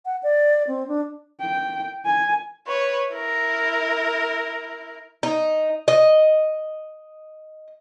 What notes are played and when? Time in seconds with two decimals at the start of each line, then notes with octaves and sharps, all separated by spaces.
0.05 F#5
0.23 D5
0.68 C4
0.88 D4
1.40 G5
2.05 G#5
2.67 B4 C#5
3.11 E4 A#4
5.23 D#4
5.88 D#5